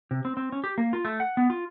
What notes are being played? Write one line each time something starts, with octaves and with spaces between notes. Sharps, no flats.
C3
C4
C4
C#4
G4
A#3
F4
A3
F#5
B3
F4